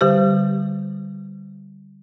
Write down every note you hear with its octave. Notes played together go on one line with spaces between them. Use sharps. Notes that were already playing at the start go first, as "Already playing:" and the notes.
D3 G3 G4 C5